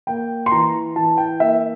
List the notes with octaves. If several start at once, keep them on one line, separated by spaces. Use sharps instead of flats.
A#3 G5
C6
E3 A#5
E3 A5
G5
A#3 E5